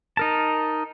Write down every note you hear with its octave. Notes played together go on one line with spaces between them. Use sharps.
D#4 A#4 A5